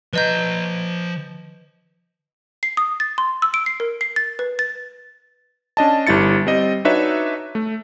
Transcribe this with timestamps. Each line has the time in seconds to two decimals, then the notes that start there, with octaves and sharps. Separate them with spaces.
0.13 F3 B4 D#5 A#5 G6
2.63 C7
2.77 D#6
3.00 A6
3.18 C6
3.42 E6
3.54 D7
3.66 C7
3.80 A#4
4.01 C7
4.16 A6
4.39 B4
4.59 A6
5.77 C#4 D4 D#5 A5
6.07 G1 G3 E4 A6 C#7
6.46 G3 C4 C5 D#5
6.85 D4 D#4 F#4 B4 C#5 E5
7.55 A3